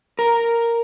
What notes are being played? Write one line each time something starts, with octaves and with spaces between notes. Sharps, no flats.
A#4